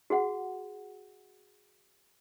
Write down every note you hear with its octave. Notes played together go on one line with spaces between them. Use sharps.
F#4 G#4 F#5